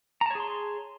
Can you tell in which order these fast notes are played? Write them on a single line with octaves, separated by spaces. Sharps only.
A#5 A5 C#5 G#4 C6